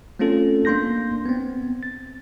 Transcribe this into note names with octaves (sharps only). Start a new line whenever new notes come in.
A3 C4 C#4 F4 A4
A#3 D4 C6 G6 A#6
B3 C4
A6